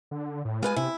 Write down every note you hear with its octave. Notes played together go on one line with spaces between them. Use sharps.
D3
A2
G#3 F4 B4 G#5
C3 E4